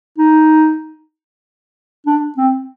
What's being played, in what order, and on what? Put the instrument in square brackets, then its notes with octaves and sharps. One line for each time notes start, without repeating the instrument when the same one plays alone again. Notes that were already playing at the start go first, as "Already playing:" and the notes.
[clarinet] D#4
D4
C4